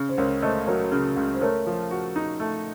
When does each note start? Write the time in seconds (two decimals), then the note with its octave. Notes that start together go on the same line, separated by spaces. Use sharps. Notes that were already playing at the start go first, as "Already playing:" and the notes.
Already playing: C#3
0.09 C5
0.18 C#2 A#4 C#5
0.42 A3 C5 D#5
0.66 F#3 A#4 C#5
0.92 C#3
1.16 C#2
1.34 C5
1.41 A3 A#4 C#5
1.67 F3
1.91 F#4
2.16 D#4
2.40 A3